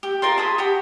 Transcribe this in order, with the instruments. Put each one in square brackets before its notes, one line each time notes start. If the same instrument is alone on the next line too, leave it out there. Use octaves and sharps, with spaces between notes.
[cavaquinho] G4
F4 A#4 D5 C6
G#4 A5 B5 D#6
F#4 G4 B5